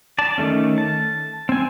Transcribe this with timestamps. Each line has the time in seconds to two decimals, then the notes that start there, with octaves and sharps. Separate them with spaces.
0.19 D5 A5
0.38 D#3 F#3 A3 C#4
0.78 A5
1.49 C4 G#5